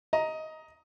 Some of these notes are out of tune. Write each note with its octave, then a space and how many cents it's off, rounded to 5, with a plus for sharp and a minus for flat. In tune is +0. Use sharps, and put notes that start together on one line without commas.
D#5 +15 A#5 +0